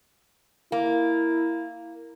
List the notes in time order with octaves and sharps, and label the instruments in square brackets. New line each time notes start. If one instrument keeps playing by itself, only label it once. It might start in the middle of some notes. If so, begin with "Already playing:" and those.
[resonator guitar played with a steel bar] A#3 [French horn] E4